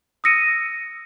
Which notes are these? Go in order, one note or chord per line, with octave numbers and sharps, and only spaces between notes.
D#6 E6 A#6 C#7 D#7